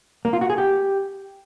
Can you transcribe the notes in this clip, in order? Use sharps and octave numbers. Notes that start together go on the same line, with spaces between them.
A#3
F4
F#4
G#4
G4